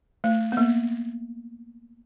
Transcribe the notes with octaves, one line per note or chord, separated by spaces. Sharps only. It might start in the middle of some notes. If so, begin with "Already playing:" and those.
A3
B3
A#3